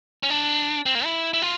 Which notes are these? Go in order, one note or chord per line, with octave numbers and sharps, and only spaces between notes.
C#4
D4
C4
A#3
E4
E4
F4